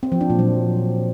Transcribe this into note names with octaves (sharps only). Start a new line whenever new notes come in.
C4
F3
D4
A#2
F#3